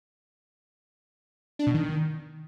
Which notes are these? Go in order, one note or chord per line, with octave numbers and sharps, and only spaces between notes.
D4
B2
D#3